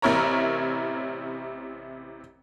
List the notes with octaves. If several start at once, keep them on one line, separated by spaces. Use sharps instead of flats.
A1 C3 E4 A#4 C#5 A#5